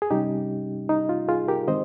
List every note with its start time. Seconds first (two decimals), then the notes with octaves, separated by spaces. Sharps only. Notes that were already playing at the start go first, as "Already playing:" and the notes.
0.02 G#4
0.11 C3 G3 C#4 D#4 G4
0.89 D#4
1.09 F4
1.29 F4 G#4
1.48 G4 A#4
1.68 D#3 G#3 C4 C5 D#5